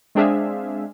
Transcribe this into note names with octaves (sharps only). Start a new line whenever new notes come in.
G#3 C4 D4 G#4 E5 F5